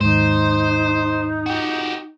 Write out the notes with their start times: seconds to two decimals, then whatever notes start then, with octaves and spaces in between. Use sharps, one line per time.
0.01 D#2 G#2 D#4 C5
1.46 F#4 G4